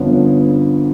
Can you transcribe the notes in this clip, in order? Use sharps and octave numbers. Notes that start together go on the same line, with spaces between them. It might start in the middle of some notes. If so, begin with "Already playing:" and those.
Already playing: G1 F2 D3 F3 B3 C#4